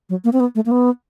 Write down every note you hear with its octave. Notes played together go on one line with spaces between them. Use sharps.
F#3
A#3
C4
B3
A3
A#3
B3